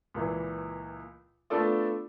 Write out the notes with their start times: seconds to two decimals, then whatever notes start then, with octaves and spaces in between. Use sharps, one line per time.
0.14 C#2 A#2 E3
1.50 A3 B3 D4 F4 A4 D5